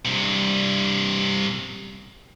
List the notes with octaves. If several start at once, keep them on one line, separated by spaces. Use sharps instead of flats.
G2 C3